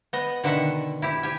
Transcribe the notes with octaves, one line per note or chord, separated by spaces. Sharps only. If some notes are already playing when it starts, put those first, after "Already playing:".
B3 D#5
B2 D3 D#3 E5 F#5
E4 G4
G4 G#5